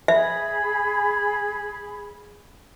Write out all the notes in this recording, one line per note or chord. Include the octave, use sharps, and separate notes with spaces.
G#4 E5 B5